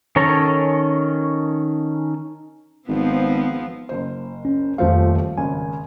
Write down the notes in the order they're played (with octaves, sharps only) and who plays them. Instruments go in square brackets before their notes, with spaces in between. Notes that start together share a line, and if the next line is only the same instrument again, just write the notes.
[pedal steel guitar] D#3 C#4 A4 C#5 A#5
[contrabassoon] G#1 [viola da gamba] F3 B3 C4
[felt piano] F#1 C5
[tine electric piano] C#4
[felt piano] D#1 F3 A3 [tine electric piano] F2 C5 F5
[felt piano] G#1 C#3 [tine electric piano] G#5